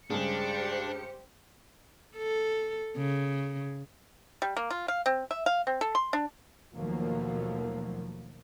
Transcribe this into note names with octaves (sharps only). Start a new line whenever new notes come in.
G2 C#3 G#3 D4 G4 G#4 C5 C#7
A4
C#3
G3
A#3
F4
F5
C4
E5
F5
C4
A4
C6
D4
D#2 B2 F3 F#3 A3 A#3